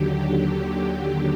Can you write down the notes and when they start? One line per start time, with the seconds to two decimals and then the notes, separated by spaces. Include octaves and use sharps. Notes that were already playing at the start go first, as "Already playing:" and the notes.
Already playing: D#2 D3 F#3 G4
0.19 G4